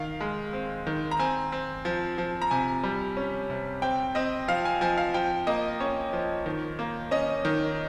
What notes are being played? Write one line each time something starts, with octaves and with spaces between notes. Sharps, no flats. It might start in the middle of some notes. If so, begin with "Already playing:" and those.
Already playing: D#3 F5
G#3
C4
D#3
A#5
C4 G#5
C4
F3
F3
A#5
C3 G#5
G3
C#4
C3
C4 G5
C4 D#5
F3 F5
G#5
F3 G#5
F5
F3 G5
A#3 D#5
C#4 C#5
F3
D#3
A#3
C#4 D#5
D#3